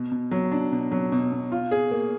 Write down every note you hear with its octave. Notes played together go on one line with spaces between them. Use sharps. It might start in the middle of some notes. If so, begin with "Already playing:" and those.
Already playing: B2
B2
F#3
D4
B2
F#3
B2
B2
F4
G#4
A#3